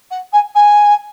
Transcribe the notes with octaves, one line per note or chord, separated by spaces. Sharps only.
F#5
G#5
G#5